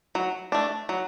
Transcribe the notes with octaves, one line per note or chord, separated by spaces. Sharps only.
F#3
A3 D4
F#3